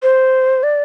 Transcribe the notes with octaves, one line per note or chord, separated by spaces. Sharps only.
C5
D5